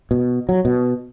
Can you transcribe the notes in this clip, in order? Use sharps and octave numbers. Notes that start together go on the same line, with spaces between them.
B2
F#3
B2